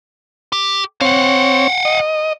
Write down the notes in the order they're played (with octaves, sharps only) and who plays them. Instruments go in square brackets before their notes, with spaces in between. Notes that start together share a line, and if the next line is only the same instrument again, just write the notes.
[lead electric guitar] G4
[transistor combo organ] C4 C#5 [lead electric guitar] F5 F#5
[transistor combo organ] D#5